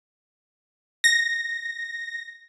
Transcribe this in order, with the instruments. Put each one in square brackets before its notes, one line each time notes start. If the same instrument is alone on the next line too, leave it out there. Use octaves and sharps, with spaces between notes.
[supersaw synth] A#6